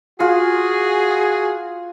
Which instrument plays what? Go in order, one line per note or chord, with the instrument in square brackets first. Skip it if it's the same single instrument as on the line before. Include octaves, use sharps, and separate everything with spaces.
[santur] F4 [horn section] F#4 G#4